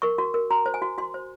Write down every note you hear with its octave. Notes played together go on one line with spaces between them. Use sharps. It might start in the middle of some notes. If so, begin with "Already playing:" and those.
A#4 C#6
F#4
A#4
F#4 A#5
C5
G#5
F#4
F#4 C6
C5